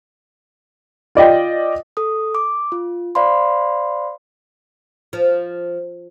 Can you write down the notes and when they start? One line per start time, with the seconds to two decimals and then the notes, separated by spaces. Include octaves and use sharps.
1.15 F4 D5 D#5 G5
1.97 A4 D#6
2.35 D6
2.72 F4
3.15 C5 D5 F5 B5 C6
5.13 F3